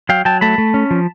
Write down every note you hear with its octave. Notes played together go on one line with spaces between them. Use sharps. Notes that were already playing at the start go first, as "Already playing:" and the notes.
F#3 F5 G5
F#3 G5 A5
A3 A5 B5
A3
C#4
F3